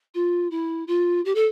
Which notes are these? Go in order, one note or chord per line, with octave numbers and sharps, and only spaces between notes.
F4
E4
F4
G4
A4